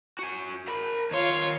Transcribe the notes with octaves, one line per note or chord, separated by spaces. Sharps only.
F#4 G#5
A#4 B5
D#2 F4 C#5 C6